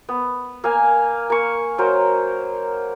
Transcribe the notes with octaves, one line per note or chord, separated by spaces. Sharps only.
B3
A#3 F5 G#5
A#3 C#6
F#3 A#4 C5